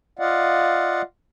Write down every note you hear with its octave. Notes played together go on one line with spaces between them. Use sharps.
F4 D5 D#5 F5 F#5